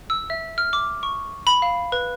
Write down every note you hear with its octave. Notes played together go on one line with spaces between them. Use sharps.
E6
E5
F6
D6
C#6
B5
F5
B4